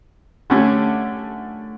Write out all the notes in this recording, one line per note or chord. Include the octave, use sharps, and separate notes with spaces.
D3 A3 C#4 G4